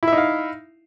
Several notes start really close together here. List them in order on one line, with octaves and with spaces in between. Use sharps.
E4 E5 D#4 F5